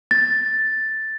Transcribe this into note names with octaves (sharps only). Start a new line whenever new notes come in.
A6